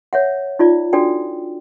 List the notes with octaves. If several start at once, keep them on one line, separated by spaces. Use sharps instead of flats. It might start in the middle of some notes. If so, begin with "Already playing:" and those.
C#5 E5 F#5
D#4 F4 D5
D4 F#4 A4 D5 G5